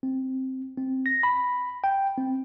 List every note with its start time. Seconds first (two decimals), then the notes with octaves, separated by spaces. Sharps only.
0.03 C4
0.78 C4
1.06 A#6
1.23 B5
1.84 G5
2.18 C4